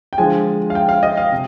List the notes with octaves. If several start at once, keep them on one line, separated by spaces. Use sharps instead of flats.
G5
D3 F3 G#3 G#5
F5
G5
F5
D#5
F5
C3